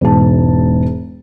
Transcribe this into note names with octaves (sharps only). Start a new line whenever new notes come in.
E1 G#2 A5